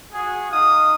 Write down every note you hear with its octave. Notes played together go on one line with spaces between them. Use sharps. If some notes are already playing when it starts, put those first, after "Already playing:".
F#4 G#4
D#4 F5 D#6